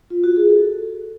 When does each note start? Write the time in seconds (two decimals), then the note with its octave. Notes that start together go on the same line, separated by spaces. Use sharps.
0.10 F4
0.24 F#4
0.36 G#4
0.50 A4